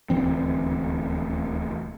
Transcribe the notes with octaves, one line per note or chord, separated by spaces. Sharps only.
D#1 D2 E3 C4